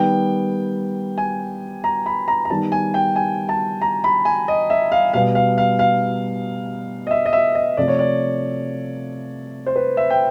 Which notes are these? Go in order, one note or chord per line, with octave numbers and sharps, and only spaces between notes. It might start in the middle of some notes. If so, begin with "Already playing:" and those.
Already playing: D#3 G3 B3 G5
G#5
A#5
B5
A#5
A#5
D#3 G3 B3 A5
G#5
G5
G#5
A5
A#5
B5
G#5
D#5
E5
F5
B2 G3 B3 F5
F5
F5
F5
D#5
E5
D#5
E5
D#5
C3 F3 A3 D5
C#5
D5
C5
B4
E5
G5